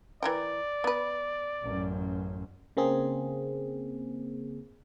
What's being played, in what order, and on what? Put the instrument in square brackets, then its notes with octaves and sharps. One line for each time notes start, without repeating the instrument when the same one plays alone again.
[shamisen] E3 A#4 G5 [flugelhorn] D5
[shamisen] B3 B4
[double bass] A1 F#2
[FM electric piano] C#3 A#3 C4 G#4